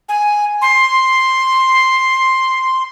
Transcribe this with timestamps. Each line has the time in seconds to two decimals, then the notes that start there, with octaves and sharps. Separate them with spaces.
0.09 G#5
0.62 C6